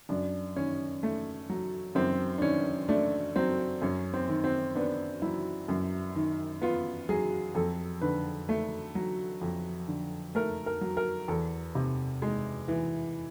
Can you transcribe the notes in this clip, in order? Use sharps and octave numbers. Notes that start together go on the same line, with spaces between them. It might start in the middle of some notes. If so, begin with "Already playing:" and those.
F#2 D4
D#3 C#4
A3
F#3
F#2 C4
D4
D#3 C#4
A3 D4
F#3 C4
F#2 C#4
C4
D#3
C4
B3 D4
F#3 E4
F#2
D#3
B3 F4
F#3 G#4
F2 A4
D3 B4
A3
F#3
F2
D3
A3 A#4
A#4
F#3
A#4
E2 A4
C3
G#3
E3